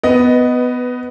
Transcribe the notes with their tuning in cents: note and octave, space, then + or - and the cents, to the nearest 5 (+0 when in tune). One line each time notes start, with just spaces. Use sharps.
B3 +15 B4 +0 D#5 +0